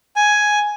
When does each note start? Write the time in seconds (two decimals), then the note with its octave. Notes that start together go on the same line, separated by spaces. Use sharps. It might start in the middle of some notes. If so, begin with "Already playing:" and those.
0.16 G#5